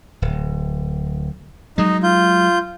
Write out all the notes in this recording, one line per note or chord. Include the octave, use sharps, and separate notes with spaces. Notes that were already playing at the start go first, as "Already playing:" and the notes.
D1
F#3 G#3 D#4
F4 G6